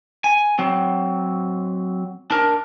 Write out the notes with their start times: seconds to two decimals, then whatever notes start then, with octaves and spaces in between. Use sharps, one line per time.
0.24 G#5
0.59 F#3 C4
2.31 D4 A#4